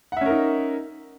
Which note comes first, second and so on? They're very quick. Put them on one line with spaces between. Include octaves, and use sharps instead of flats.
F#5 E5 C#4 A#4 D#4